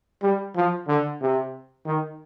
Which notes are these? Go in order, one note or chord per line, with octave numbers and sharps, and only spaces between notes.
G3
F3
D3
C3
D#3